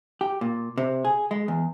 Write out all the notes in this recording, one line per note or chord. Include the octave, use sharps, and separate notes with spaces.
G4
A#2
C3
G#4
G#3
E2